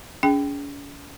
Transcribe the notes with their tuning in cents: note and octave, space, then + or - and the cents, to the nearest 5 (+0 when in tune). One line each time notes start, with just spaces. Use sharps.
C#4 +40 G#4 +5 G5 +0